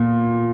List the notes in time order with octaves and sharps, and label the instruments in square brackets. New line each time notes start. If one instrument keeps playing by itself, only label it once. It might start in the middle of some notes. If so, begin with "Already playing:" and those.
Already playing: [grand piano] A#2